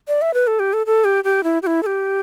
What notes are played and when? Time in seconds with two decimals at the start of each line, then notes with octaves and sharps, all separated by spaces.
0.08 D5
0.22 E5
0.34 B4
0.47 A4
0.59 G4
0.73 A4
0.86 A4
1.05 G4
1.24 G4
1.44 E4
1.62 G4
1.67 E4
1.83 A4
1.86 G4